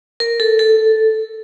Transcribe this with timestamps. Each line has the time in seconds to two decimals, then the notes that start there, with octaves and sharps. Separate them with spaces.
0.20 A#4
0.40 A4
0.59 A4